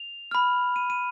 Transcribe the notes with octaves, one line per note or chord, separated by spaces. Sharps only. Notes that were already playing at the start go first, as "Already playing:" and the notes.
Already playing: F7
B5 F6
D#7
D#7